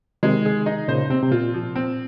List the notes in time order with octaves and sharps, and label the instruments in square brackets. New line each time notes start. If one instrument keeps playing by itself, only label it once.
[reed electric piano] C3 D#3 [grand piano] G#3
[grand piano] G#4
D#4
[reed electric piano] A#2 C#3 [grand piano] C5
[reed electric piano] C3 [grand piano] C4
[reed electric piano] C3
[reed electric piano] A#2 [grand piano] F4
[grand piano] F3
C4